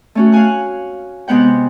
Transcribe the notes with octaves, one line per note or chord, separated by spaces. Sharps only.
A3 C#4 F#4
F5 F#5 G#5 F#6
C3 G#3 B3 F#5 G5